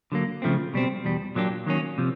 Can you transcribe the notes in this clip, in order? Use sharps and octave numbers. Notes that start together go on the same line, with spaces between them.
D3 F#3 A#3
C#3 F3 A3 C4
B2 G3 C4
E2 B2 G3
A#2 F#3 A#3 D4 G4
D#3 F#3 A#3 C#4
C3 F3